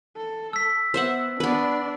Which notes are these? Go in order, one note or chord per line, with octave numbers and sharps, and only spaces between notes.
A4
E6 B6
B3 C5 E5 F#5
B3 D4 B4 D5